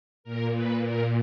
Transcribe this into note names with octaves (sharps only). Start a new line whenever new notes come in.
A#2 A#4
B4
A#4